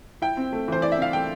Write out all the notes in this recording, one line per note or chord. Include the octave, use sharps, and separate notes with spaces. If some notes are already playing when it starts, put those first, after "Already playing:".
E4 G5
C4
A3
E3 C5
E4 D5
E5
C4 F5
A3 G5